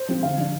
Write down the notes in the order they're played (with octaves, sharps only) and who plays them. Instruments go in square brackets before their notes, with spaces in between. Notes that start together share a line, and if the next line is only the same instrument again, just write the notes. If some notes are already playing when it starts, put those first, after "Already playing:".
Already playing: [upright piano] C5
F3 C4 F4
D3 F5
F3 D4